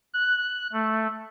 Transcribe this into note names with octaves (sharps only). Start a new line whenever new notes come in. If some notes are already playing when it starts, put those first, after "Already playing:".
F#6
A3